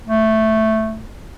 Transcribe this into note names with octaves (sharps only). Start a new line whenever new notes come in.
A3